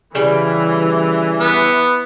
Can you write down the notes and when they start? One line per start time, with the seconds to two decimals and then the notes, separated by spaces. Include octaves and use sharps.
0.15 C#3 E3 G3
1.41 B3